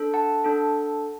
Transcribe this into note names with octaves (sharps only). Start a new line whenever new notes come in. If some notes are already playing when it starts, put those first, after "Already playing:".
Already playing: D4 A4
F#5 A5
D4 A4